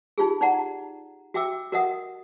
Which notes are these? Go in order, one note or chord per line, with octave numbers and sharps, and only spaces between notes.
D#4 F4 G4 G#4
D#4 D5 F#5 A#5
F#4 E5 G5 D6 E6
F#4 A#4 D#5 E5 F#5 D#6